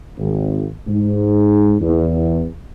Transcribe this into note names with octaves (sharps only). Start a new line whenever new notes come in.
G#1
G#2
E2